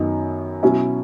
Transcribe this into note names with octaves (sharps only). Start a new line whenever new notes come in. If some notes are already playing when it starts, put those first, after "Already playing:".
Already playing: F#2 D#3 F#3 B3 D#4
B2 F#3 C#4 E4